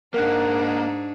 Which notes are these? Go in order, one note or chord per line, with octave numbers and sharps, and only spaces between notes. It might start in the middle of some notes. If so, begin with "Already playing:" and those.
G#2 A#3 D4 D#4 A#4 F#5 F#6